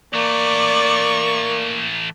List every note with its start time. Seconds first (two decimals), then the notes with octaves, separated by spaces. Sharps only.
0.14 E3 A3 A#3 D5 C#6